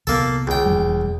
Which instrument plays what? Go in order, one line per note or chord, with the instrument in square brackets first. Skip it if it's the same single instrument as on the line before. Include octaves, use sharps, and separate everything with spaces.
[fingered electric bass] C2 B3 [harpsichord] A#3 A4
[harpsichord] C#2 G5
[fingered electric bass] E1 G3